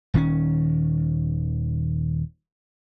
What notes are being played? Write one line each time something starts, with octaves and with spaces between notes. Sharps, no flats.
D#1 D#3 C4 C#4